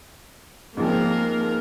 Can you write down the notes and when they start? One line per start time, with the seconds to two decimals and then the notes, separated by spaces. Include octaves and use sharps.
0.77 G#2 F3 A#3 C4 A#4